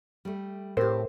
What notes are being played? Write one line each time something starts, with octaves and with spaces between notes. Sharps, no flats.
G3 A3
A2 C4 G4 A#4 C5